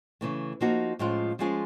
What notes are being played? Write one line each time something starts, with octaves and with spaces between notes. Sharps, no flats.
C#3 E3 A3
F3 A#3 D#4 F#4
A2 F3 G#3 C#4 F4
F3 G#3 C#4 F4 G#4